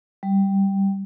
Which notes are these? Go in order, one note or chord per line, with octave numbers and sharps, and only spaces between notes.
G3